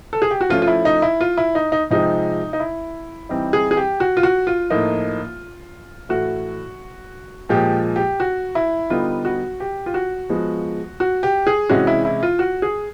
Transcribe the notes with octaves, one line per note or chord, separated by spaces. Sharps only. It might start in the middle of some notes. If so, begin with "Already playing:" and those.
A4
G#4
G4
F#4
F3 A3 C#4 F4
F4
E4
D#4
E4
F4
E4
D#4
D#4
C3 F3 G#3 C4 D#4
D#4
E4
E3 G3 C4 D#4
G#4
G#4
G4
F#4
F4
F#4
F4
A2 F3 A#3 D#4
A2 E3 A3 F#4
A#2 F3 G#3 G4
G4
F#4
E4
D3 G3 B3 D#4 F4
F#4
G4
F4
F#4
F3 G#3 B3
F#4
G4
G#4
C3 E3 G#3 C#4 F#4
E4
E4
F4
F#4
G#4